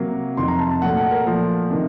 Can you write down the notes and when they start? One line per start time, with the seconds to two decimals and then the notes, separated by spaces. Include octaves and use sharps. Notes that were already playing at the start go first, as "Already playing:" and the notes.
Already playing: C3 F#3 A#3
0.37 F2 C3 D#3 C6
0.48 A#5
0.59 A5
0.71 A5
0.81 A#2 F#3 A3 F#5
0.97 F#5
1.11 A#4
1.26 A#2 F3 A3
1.71 C3 D#3